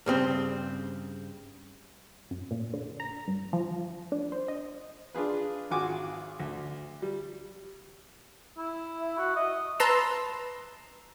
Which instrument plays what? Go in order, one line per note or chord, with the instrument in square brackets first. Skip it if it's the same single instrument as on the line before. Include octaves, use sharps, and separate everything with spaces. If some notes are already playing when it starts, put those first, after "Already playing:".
[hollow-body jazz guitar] G2 C#3 C4
[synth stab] F#2
A#2
D3
A#5
G2
F3
D4
C5
D#5
[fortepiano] D4 F4 G#4 B4
G#1 F4 F#4 G#5 D6
D2
G3
[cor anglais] E4
[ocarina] E5
[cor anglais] F#4
[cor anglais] D#5 [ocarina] E5
[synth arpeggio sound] B4 A5 A#5 C6 E6